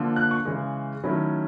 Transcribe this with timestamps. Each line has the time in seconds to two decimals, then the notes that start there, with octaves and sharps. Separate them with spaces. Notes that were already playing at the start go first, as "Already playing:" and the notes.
Already playing: D3 F3 A#3
0.16 F#6
0.31 C#6
0.45 C#3 E3 G#3
1.04 D#3 F#3 A3 C#4 E4 B5